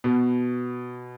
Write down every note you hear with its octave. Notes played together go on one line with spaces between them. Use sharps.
B2